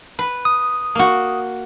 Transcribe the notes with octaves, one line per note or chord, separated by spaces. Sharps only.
B4
D#6
A#3 F#4